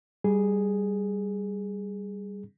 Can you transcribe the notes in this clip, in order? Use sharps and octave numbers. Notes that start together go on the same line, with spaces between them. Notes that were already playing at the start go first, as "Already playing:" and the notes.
G3 G#4